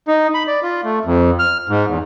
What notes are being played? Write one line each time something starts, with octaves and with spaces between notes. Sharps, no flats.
D#4
B5
D5
F4
A3
F2
F6
G#2
E2